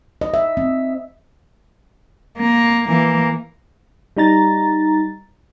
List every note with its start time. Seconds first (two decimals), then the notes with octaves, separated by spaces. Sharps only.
0.21 D#5
0.34 E5
0.57 C4
2.38 A#3
2.87 E3 A#3
4.17 G3 D#4 A#5 A6